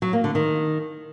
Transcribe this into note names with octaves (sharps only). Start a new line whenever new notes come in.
F#3
A#3
D3
D#3